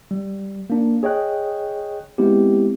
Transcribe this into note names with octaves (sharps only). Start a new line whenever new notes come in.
G3
A#3 D4
G#4 C#5 D#5 G5 F#6
G#3 B3 C4 E4 G4